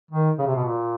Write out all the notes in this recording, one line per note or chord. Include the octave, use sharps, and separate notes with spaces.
D#3
C#3
C3
B2
A#2